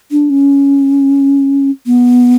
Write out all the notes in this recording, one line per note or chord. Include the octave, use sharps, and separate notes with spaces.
D4
C#4
B3